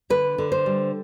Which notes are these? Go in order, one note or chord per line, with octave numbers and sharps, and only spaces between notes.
D3 B4
D3
C5
G3